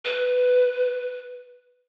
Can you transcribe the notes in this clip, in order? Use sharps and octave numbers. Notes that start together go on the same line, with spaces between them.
B4